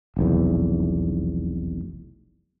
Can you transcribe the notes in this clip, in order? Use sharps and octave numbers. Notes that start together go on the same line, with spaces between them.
F1 B1 E2